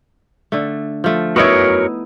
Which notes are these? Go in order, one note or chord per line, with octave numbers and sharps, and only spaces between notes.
D3 A3
F3 A3
B3 D#4 E4 F#4 A#4 C#5